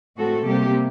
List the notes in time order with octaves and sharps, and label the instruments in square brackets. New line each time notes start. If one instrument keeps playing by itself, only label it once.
[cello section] A2 A3 C4 F#4 A4
C3 G3 A#3 G4